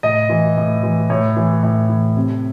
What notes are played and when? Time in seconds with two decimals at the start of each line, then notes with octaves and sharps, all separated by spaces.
0.03 A2 D#5
0.30 E3
0.57 A2
0.83 E3
1.09 A2 C#5
1.37 E3
1.63 A2
1.90 E3
2.16 C3